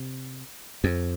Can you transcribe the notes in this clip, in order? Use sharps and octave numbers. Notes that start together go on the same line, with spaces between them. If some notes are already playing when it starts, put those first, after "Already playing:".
Already playing: C3
F2